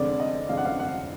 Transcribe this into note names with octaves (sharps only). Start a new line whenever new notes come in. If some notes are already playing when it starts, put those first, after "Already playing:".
Already playing: F1 F2 D3 G#3 D5
D#5
F1 F2 D3 G#3 F5
F#5
F5
F#5